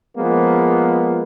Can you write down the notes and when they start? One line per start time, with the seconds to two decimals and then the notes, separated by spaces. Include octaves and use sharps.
0.17 F3 G#3 A#3 B3